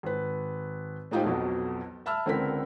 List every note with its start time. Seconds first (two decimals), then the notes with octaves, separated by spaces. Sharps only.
0.03 G#1 B4
1.11 A2 G#3 D#4 F4 G4 C5
1.24 B1 F2 B2 F#3
2.06 E5 A5 B5 E6 F6
2.26 C#2 D3 C4 A#4 B6